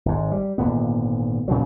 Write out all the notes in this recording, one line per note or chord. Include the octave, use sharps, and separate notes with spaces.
G#1 G#2
G3
G#1 A#2 D3 B3
A#2 C#3 F3 F#3